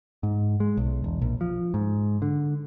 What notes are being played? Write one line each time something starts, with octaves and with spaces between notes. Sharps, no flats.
G#2
G#3
B1
E1
A#1
F3
G#2
D3